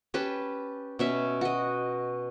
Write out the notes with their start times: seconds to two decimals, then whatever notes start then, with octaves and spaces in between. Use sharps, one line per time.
0.14 C#4 G4 B4 A5
0.99 B2 C#4 E5
1.41 F#4 D#5